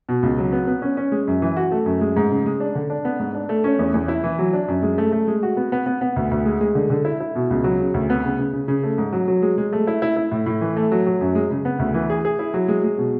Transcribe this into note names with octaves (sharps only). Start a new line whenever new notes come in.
B2
C#2
F#3
B3
B3
C#4
C#4
G#3
F#2
E3
F#4
A3
F#2
G#3
G#2
C#3
G#3
D4
D3
D4
B3
G#2
D4
A3
C#4
E2
E2
E4
E3
F#3
D4
F#2
G#3
A3
A3
G#3
F#4
B3
B3
B3
B3
D2
D2
G#3
G#3
D3
D3
E4
E4
B2
C#2
F#3
C#3
D2
B3
C#3
C#3
C#3
C#3
A3
G#2
F#3
F#3
G#3
G#3
A3
E4
E4
E4
A2
A2
E3
A3
F#3
F#3
F#2
G#3
C#3
B3
D2
E3
G#4
G#4
E4
F#3
G#3
G#3
B2